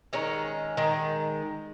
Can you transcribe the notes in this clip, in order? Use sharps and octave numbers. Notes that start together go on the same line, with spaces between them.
D#3 G#3 C#4
D#3 G#3